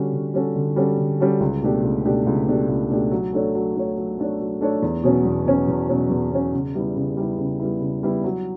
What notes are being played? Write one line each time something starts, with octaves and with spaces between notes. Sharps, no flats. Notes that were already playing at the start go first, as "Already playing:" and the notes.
Already playing: D3 G3 C#4 F#4 A4
D3
G3 C#4 F#4 A4
D3
G3 C#4 F#4 A4
D3
G3 C#4 F#4 A4
C#2
B2 A3 D4 G4
C#2
B2 A3 D4 G4
C#2
B2 A3 D4 G4
C#2
B2 A3 D4 G4
F#3
A3 D4 A4 C#5
F#3
A3 D4 A4 C#5
F#3
A3 D4 A4 C#5
F#3
A3 D4 A4 C#5
E2
B2 F#3 C#4
E2
B2 F#3 C#4
E2
B2 F#3 C#4
E2
B2 F#3 C#4
C#3
G3 B3 E4
C#3
G3 B3 E4
C#3
G3 B3 E4
C#3
G3 B3 E4
F#3